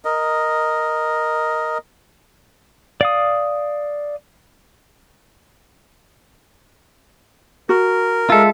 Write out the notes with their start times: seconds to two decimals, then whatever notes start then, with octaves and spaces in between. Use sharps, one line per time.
0.05 A#4 D#5
3.01 D5 F5 D#6
7.69 F#4 A#4
8.30 G#3 F4 A4 E5